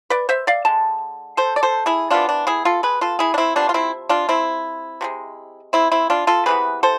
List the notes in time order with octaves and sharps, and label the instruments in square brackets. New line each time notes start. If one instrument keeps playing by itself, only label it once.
[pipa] B4 D5
C5 E5
D5 F5
D3 G#3 A5
A4 C5
D5
A4 C5
E4 G#4
C3 E3 B3 D4 F4
D4
E4 G#4
F4 A4
G#4 B4
F4 A4
E4 G#4
D4
C4 E4
C3 F3 B3 D4
F4
C4 E4
D4 F4
C4 E4
C3 F3 G#3
C4 E4
C4 E4
D4 F4
F4 A4
C3 E3 B3 G#4 B4
A4 C5